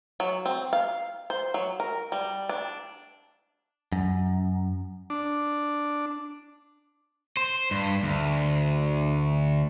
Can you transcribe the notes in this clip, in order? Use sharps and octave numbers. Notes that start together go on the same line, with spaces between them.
F#3
C4
F5
C5
F#3
A#4
G3
D4
F#2
D4
C5
G2
D2